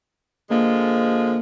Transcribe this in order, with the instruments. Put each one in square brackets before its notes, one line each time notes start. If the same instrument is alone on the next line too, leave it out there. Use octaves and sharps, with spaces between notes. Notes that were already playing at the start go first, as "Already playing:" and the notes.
[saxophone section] D3 F3 G#3 [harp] A#3